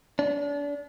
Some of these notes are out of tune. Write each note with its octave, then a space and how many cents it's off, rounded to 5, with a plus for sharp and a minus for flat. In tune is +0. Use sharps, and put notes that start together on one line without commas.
D4 -35